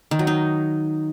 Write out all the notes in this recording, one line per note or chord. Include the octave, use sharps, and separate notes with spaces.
D#3
F#3
D#4